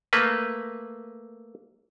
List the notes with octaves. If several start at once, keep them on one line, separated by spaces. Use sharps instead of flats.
A3 A#3 B4